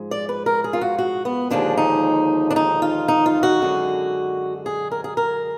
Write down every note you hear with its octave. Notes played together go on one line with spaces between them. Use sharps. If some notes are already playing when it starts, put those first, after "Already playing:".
Already playing: G#2 F3 G#3
D5
B4
A#4
G#4
F4
F#4
F#4
B3
D#2 D3 F3 G#3 D4
D#4
D4
D#4
F4
D#4
F4
F#4
F#2 D3 G#3
G#4
A#4
G#4
A#4